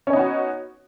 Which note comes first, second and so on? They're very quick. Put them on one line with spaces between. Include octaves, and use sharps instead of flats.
C#4 C#5 D#4 B3 F#4